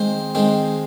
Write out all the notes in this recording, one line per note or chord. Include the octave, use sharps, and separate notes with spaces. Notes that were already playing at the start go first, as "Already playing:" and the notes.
Already playing: D#3 G#3 C4 C5
D#3 G#3 C4